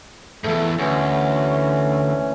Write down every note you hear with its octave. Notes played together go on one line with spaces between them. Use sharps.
E2 G#2 A3 A4
D2 E3 C#4